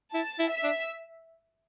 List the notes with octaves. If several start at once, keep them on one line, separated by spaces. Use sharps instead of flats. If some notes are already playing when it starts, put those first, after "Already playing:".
E4 A5
E4
E5
D4